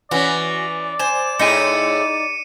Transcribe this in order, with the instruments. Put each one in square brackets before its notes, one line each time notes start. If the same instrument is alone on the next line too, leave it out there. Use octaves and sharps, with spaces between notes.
[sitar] E3 C#4 [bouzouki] F#4 [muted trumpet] D5
[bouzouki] C5 G#5 [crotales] E7
[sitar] A2 E4 G#4 [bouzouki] D#4 [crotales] C#7 D#7